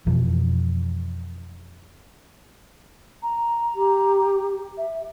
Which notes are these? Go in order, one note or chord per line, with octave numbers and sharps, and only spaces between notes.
F2 B2 E3 F3
A#5
G4
E5